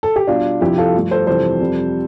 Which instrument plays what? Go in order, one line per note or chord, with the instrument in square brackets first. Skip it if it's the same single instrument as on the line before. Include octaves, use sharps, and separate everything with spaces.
[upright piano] A4
G4
B2 G3 D4 F4
F2 C3 F3 E4 G4
F4 A4
G2 F3 A3
A4 C5
F2 C3 E3 G3 A4 C5
F2 C3 G3